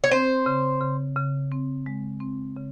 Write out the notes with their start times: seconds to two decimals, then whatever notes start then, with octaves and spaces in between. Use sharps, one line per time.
0.04 C#5
0.11 C4 C5
0.46 C#3
0.81 C#3
1.16 C#3
1.51 C4
1.86 G#3
2.20 C4
2.57 C#3